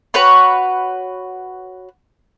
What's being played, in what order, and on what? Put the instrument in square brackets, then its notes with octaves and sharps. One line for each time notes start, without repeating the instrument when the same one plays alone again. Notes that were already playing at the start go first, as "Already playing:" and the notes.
[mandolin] F#4 B4 C#5 B5